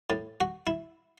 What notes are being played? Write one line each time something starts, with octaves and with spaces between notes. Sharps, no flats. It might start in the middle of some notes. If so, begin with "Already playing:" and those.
A2
F#4
E4